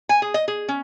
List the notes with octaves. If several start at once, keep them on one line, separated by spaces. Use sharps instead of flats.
G#5
G#4
D#5
G#4
C#4